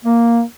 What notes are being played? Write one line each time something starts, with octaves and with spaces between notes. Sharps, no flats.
A#3